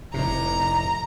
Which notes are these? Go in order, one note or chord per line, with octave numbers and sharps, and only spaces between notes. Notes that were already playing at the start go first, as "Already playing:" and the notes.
F1 A2 C3 A#5